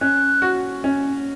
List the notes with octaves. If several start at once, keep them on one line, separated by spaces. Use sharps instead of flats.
C#4 F#6
F#4
C#4